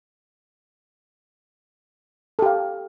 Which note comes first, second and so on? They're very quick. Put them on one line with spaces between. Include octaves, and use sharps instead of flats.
A4 G4 F5